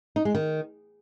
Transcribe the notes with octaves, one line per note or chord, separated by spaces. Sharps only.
D#4
G#3
D#3